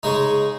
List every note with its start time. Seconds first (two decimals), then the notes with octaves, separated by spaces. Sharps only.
0.03 C#3 G#3 D#4